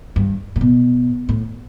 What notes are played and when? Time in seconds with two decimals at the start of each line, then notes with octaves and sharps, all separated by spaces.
0.16 G2
0.56 A2
0.61 B2
1.29 A2